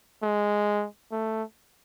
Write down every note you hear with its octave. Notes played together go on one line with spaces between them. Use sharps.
G#3
A3